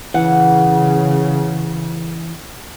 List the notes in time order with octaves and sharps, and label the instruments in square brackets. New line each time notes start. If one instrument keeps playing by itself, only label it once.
[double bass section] C#3 [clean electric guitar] E3 [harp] F#5